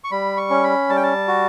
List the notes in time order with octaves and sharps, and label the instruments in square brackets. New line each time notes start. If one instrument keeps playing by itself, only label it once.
[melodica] C#6
G3 B5
C#6
C#4
B5
G3 A5
G5
A5
F#4